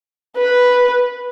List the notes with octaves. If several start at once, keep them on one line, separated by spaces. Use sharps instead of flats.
B4